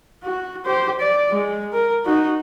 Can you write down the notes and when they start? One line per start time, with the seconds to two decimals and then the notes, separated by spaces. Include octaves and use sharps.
0.23 F#4
0.66 G4 C5
1.00 D5
1.31 G#3
1.73 A#4
2.05 D#4 F#4